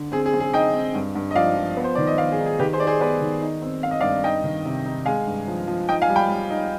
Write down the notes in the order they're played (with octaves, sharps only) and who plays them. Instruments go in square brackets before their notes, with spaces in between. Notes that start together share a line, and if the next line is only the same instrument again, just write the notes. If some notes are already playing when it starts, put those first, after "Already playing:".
Already playing: [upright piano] D3
C4 G#4
G#4
C4
G#4
D#4 D#5 G5
C4
G2
G2
D#5
F3 D5 F5
F3
B3
C5
D#3 D5
D#5
B3 D5 F5
G#4
D#4
G#4
D#3 G4 B4
G#4 C5
D#4 D5
G#4 C5
B3 B4 D5
D#3
D#4
C4
C4 F5
D#5
G2 D5 F5
D#4 D#5 G5
D#3
C3
D#4
G#3 F5 G#5
G2
F3
F3
D#4 D#5 G5
F5 G#5
G3
G5 B5
G3
D#4